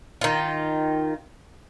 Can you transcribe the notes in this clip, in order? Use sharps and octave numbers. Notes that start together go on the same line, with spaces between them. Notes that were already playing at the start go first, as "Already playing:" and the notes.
D#3 F4